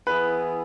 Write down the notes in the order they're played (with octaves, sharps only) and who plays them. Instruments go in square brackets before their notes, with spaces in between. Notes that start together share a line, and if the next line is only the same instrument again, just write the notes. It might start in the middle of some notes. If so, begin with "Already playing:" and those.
[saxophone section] E3 B3 E4 G#4 [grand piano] B4